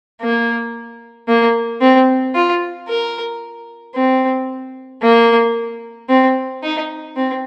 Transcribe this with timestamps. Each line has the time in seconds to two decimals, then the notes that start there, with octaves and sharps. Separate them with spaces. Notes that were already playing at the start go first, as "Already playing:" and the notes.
0.21 A#3
1.28 A#3
1.81 C4
2.35 F4
2.88 A#4
3.95 C4
5.02 A#3
6.09 C4
6.63 D#4
7.16 C4